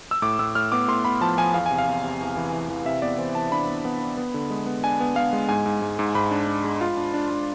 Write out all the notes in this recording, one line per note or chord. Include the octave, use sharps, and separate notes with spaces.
E6
A2 D6
A2 E6
A2 F6
B3 D6
A2 C6
B3 B5
F3 A5
F3 G#5
E2 F5
C3 G#5
F5
E2
C3
E2
E3
E3
E3
C3 E5
B3 D5
E3 C5
E3 A5
D4 B5
B3
B3
B3
B3
D3
G#3
B3
D4 G#5
B3
B3 F5
G#3
G#2 G#5
G#2
G#2
G#2
G#2 B5
D4
D4
G#3
F4
D4
D4
D4